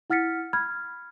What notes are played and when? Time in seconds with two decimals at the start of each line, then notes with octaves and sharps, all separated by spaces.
0.10 E4 F#5 F6 A6 B6 C#7
0.53 B5 F6 G#6